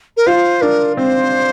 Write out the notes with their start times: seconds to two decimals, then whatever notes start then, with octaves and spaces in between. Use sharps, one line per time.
0.17 A#4
0.27 F4 C5
0.61 D4 A#4
0.97 C4 C5